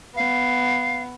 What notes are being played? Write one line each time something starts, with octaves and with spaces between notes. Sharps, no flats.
B3 F5